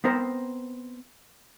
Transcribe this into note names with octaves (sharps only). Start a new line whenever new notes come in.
B3 C4 A#4 C5